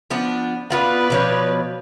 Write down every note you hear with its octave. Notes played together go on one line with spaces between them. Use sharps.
F3 B3 D4
B3 F4 B4 D5 F#5
B2 F3 C#5